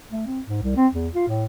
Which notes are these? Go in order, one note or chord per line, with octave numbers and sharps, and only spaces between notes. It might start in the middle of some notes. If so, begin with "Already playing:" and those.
A3
C4
G#2
C2
C4
E2
F4
A2